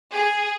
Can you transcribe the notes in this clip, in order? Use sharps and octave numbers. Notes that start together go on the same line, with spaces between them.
G#4